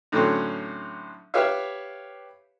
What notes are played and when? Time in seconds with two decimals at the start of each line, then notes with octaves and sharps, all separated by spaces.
0.12 A2 D3 F#3 C4 C#4
1.34 G4 B4 C#5 E5 F5